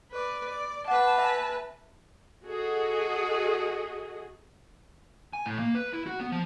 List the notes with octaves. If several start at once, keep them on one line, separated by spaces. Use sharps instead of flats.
B4 D5
D5
B4 F#5 A5 D6
E5 G#5
F#4 G#4 A4 D#5
G#5
A2
A#3
B4
E4
F#4
B3
F3